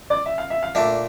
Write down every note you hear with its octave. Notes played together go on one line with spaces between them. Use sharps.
D5
E5
F5
E5
F5
A#2 A3 D4 E5